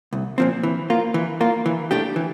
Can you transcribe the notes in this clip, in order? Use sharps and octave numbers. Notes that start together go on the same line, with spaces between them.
C2
A#2 F3 C4
E3
A#3 F4
E3
A#3 F4
E3
A3 D4 G4
E3